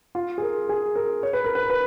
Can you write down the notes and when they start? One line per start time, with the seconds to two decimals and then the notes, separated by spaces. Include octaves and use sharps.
0.15 F4
0.38 G#4
0.42 A#4
0.69 G#4
0.96 A#4
1.23 C#5
1.33 B4
1.44 A#4
1.55 B4
1.63 A#4
1.70 B4